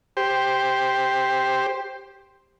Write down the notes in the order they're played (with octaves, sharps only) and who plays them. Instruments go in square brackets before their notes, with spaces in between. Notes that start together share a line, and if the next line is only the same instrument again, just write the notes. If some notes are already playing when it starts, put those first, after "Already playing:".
[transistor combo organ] G4 C5